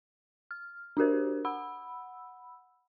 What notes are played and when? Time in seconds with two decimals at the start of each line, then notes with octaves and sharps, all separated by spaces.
0.51 F6
0.97 D4 F#4 G4 A#4 C5
1.45 F#5 B5 E6